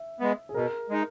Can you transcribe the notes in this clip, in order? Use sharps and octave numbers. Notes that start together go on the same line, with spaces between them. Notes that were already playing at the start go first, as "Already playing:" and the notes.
Already playing: E5
G#3 B3
G#4
B2 A#4
G#3 D#4